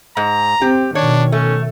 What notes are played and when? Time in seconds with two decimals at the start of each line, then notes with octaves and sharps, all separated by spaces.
0.17 G#2 A#5
0.61 C4 G4
0.95 B2 D#3 D4 C#5
1.32 A3 C#4